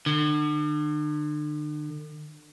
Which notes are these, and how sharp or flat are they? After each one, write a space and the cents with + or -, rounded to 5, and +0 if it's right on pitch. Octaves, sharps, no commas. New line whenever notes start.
D3 +40